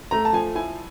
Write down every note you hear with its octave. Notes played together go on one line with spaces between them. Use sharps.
A3 A#5
A5
F3 G#5
E4 G#5